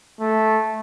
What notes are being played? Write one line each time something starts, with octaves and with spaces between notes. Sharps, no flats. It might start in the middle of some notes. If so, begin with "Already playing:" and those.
A3